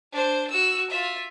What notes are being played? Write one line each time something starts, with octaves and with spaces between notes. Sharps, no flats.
D4 C5
F#4 E6
F4 E5